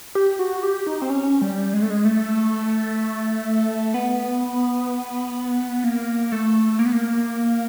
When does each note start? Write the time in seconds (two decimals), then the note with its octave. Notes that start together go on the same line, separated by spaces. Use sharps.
0.15 G4
0.39 F#4
0.63 G4
0.87 D#4
1.02 C4
1.10 C#4
1.41 G3
1.73 G#3
1.82 A3
1.90 G#3
2.05 A3
3.94 B3
5.84 A#3
6.32 A3
6.79 A#3
6.86 B3
6.93 A#3